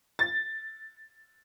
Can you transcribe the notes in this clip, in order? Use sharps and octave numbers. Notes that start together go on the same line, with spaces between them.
A6